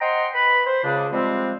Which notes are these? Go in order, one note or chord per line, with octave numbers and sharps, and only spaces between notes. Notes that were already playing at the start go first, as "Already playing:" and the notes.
C5 D#5 F#5 G5 A#5 C6
B4 B5
C5
C#2 C#3 D4
F3 G3 G#3 C4